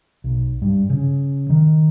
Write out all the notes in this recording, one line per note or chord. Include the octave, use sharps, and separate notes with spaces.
B1
G2
C#3
D#3